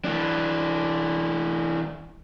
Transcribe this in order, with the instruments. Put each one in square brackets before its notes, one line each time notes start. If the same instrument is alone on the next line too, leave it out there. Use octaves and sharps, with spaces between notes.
[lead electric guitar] E3 D4